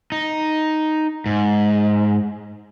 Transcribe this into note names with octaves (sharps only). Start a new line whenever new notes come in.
D#4
G#2